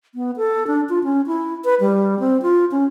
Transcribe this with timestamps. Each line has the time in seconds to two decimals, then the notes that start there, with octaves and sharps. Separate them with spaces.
0.15 B3
0.37 A4
0.67 D4
0.89 F4
1.04 C#4
1.27 E4
1.65 B4
1.80 G3
2.19 C4
2.42 F4
2.71 C#4